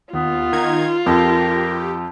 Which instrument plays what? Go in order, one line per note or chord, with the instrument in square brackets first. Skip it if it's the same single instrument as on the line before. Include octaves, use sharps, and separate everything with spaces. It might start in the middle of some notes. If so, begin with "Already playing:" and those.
[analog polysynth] D#2 [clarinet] B3 [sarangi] F4
[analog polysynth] D#3 D#4 G#6
[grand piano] F2 [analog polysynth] G4 [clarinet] A#4